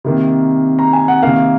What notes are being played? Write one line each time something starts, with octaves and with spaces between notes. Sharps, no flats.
C3 D#3 A#3
A#5
G#5
F#5
C3 D#3 A#3 F5